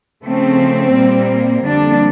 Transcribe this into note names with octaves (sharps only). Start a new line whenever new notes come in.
C#3 F3 A3 C4
A#2 G3 A#3
F2 D3 G3 A#3 D4